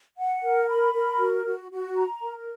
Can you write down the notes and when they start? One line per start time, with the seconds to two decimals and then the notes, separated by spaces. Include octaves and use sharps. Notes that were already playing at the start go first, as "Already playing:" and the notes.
0.17 F#5
0.43 A#4
0.68 B5
0.94 A#4
1.20 F#4
1.45 F#4
1.71 F#4
1.96 A#5
2.22 A#4